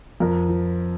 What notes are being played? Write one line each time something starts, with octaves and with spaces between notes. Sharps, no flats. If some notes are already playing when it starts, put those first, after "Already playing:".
F2 A#4
F3